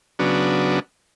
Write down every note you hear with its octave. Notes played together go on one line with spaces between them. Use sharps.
C#3 F#3 B3 D4